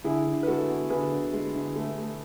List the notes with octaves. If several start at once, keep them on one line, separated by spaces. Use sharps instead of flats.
D3 E4 G#4
D3
B4
G#3 F#4 A4
B3
D3 G#4 B4
D3
G#3
D3
A3
A3